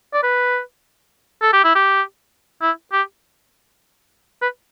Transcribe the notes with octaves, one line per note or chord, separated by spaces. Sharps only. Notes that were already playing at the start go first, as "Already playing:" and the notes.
D5
B4
A4
G4
E4
G4
E4
G4
B4